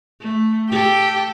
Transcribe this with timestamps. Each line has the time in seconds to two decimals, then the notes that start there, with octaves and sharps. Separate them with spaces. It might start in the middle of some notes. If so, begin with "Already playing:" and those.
0.20 A3
0.71 G4 A4